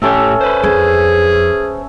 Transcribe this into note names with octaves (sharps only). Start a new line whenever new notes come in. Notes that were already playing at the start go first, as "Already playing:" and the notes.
A2 C#4 G4 A4 E5 G5
B4 C5
F2 G#4